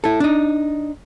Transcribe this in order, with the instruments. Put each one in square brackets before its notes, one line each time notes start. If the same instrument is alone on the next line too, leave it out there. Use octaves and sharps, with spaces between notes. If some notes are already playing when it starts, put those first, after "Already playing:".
[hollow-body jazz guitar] E4 A4
D4 D#4